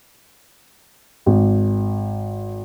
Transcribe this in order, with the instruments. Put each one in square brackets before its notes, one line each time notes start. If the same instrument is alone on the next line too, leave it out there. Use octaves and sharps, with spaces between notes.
[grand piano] G#1